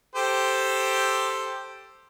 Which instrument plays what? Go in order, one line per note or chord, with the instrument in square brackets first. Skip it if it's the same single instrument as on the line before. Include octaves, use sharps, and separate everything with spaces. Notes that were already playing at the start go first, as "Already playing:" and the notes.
[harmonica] G4 A4 C5